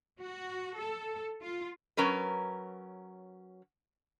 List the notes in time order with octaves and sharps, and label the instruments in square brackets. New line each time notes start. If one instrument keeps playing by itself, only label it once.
[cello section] F#4
A4
F4
[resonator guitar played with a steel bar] F#3 C#4 A#4 B4